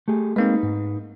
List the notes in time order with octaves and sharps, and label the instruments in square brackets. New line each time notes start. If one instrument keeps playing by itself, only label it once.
[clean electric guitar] A3 G4 G#4
[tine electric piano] G#3 A#3 C4 [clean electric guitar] D#4 B4
[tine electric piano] G#2